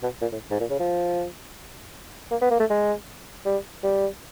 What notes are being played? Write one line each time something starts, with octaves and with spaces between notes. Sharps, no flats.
B2
A#2
A2
G#2
A#2
C#3
F3
A#3
B3
A#3
A3
G#3
G3
G3